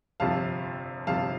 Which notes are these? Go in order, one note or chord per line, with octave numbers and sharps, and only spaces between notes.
G1 F2 C3 F3 F5 A5
G1 F2 C3 F3 F5 A5